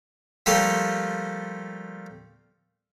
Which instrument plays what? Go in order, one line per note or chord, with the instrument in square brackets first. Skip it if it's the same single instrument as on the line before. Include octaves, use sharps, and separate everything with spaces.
[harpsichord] F3 G3 A3 A#3 A4 C6